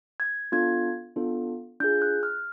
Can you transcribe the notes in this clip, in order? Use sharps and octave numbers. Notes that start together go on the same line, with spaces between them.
G#6
B3 D4 F4 A4 G#6
B3 D4 F4 A4
D4 F4 G#4 G6
F#6
F6